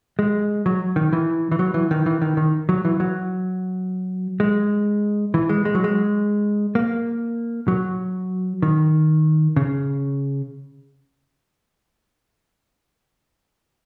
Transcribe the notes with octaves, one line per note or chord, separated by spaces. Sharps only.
G#3
F#3
D#3
E3
E3
F#3
E3
D#3
E3
D#3
D#3
F#3
E3
F#3
G#3
E3
G#3
G#3
F#3
G#3
A#3
F#3
D#3
C#3